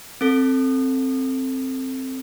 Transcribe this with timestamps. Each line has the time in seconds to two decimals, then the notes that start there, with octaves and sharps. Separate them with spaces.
0.21 C4 A4